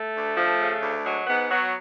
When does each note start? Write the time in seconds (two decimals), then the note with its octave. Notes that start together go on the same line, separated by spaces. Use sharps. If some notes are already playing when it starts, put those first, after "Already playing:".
Already playing: A3
0.15 D2
0.37 F3
0.59 C#3
0.83 D2
1.05 F#3 G#3
1.27 G#2 B3
1.49 F#3 B3